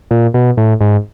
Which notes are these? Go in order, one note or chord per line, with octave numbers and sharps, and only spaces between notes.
A#2
B2
A2
G#2